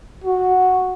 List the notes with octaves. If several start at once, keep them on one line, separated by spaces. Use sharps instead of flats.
F#4